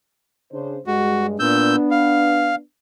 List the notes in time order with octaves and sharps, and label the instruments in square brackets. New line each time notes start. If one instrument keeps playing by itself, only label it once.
[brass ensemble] C#3 D4 C5
[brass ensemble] G2 G#3 [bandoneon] F#4
[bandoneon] A#2 E6 G6 [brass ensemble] B3 D4
[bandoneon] F5